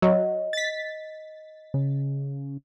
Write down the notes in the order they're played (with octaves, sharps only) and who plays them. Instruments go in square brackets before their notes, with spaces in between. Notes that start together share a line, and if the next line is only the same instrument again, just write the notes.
[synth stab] F#3 [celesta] D#5
[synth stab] A6 B6
[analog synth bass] C#3